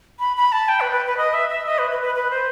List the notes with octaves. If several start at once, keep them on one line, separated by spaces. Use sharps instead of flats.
B5
B5
A5
G5
B4
B4
B4
D#5
E5
E5
D#5
B4
B4
B4
B4
C5